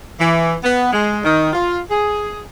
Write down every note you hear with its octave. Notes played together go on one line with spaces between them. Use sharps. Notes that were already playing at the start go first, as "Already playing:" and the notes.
E3
B3
G#3
D#3
F4
G#4